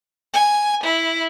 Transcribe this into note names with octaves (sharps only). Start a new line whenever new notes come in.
G#5
E4